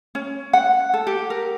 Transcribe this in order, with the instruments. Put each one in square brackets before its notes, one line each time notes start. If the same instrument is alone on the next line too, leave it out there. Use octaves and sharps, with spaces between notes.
[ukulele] C#4
F#5
A4
G4
A#4